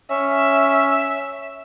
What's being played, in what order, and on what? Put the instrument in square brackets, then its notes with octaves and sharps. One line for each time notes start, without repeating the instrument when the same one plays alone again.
[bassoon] C#4 [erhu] E5